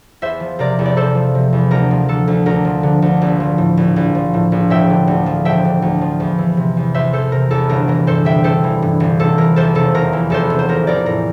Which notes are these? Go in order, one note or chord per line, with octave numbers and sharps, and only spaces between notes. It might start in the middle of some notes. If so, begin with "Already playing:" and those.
E2 C5 E5
F3
C3 A#4 D5
E2
D5
E2 A4 C5
F3
C3
E2
D2 A#4
F3
D3 A4
D2
D2 A#4
F3
D3
D2
A#1
F3
A2
A#1
A#1
F3
A2
A#1
E1 E5 G5
D3
D2
F3
E1 E5 G5
D3
D2
F3
E2
E3
C3
E2
E2 C5 E5
E3 A4 C5
C3 A#4
E2 A4
G1 A#4
E3 A#4
G2 A4 C5
G1 E5 G5
G1 A4 C5
E3
G2
G1
F1 A4
E3 A#4
E2 A4 C5
F1 A4
F1 A#4
E3
E2 A4 C5
F1
C5
A1 A#4
E3 A#4 D5
A2 A#4